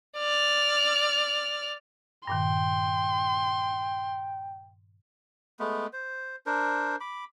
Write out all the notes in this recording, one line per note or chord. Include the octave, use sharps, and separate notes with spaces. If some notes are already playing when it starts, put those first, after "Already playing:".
D5 F6
G2 A#2 D#3 G5 C6
G#3 A3 B3
C5
D4 A#4 C5
B5 D6